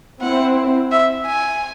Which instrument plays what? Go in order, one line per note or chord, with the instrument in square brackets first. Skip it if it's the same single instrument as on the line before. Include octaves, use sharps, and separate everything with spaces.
[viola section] C4 E4 C5 [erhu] F#5
[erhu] E5
G#5